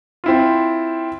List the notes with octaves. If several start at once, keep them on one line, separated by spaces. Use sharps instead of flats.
C4 E4 F4